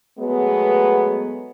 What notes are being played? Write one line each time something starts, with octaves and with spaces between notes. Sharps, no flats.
F#3 G#3 A3 B3